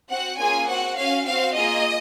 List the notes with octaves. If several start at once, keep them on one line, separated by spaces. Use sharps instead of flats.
C4 F#4 F#5
A#3 C#4 F4 G#4 G#5
C4 F#4 F#5
C#4 F#4 F5
C4 F#4 F5
A#3 F4 G#4 D#5